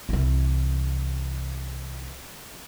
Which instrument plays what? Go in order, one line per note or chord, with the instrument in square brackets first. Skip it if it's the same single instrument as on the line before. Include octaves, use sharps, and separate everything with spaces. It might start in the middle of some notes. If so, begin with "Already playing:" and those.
[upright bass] C2 E3